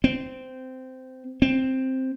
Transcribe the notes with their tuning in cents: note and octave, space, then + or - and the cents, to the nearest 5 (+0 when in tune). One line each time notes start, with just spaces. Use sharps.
C4 -15
C4 +5